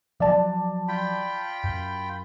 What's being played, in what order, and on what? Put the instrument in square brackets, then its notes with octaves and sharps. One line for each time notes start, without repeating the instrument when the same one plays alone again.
[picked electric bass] F3 F#3 [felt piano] D5 A5
[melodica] F4 G5 B5
[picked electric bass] F#2